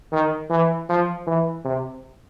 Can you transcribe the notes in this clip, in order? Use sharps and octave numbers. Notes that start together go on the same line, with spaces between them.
D#3
E3
F3
E3
C3